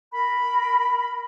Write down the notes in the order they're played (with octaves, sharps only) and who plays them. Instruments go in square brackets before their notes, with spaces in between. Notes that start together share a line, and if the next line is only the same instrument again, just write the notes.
[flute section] A#4 B5